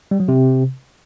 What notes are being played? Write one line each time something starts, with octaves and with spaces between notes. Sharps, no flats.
G3
F#3
C3